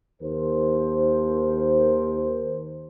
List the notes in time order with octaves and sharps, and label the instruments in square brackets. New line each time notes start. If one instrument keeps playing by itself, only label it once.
[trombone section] D#2 A#4 C5